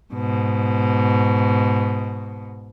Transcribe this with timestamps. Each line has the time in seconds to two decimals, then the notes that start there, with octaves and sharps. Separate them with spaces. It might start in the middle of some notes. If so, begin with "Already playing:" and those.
0.14 G#2 B2